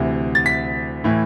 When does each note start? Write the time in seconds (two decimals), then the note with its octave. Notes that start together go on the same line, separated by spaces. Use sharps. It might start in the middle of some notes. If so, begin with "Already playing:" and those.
Already playing: D2 C3 E3
0.35 A6
0.46 B6
1.04 A2 E3